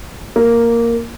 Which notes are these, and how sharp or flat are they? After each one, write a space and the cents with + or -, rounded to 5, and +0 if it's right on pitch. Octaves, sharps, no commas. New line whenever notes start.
A#3 -5